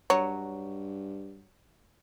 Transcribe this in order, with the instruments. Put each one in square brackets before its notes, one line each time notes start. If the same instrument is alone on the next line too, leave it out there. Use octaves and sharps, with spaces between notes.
[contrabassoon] G2 [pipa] F#3 [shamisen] C#5